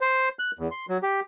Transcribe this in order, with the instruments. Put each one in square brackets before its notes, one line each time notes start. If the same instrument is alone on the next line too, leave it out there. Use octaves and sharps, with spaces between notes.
[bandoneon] C5
F#6
E2
C6
F#3
G4